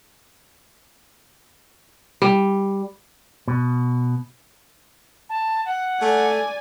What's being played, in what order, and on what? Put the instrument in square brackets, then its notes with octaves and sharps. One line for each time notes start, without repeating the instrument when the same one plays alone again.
[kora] G3
[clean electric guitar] B2
[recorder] A5
F#5
[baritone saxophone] A3 [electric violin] D5 G#5